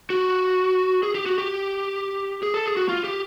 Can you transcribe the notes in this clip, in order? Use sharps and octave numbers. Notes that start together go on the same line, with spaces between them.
F#4
G#4
G4
F#4
G4
G#4
A4
G#4
F#4
F4
G4